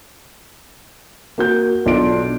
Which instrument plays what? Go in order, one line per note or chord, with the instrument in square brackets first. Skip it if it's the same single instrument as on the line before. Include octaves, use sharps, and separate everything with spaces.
[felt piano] A#3 F#4 G6
[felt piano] B1 D7 [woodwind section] D4 F4